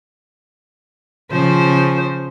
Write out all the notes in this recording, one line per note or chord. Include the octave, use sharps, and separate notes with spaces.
C#3 F3 C5